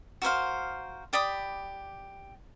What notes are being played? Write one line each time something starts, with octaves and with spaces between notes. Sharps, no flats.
F#4 A#4 C5 F5
G4 D5 B5 D#6